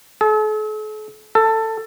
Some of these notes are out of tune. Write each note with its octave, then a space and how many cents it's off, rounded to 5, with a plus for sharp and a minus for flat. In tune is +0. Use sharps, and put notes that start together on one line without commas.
A4 -45
A4 +15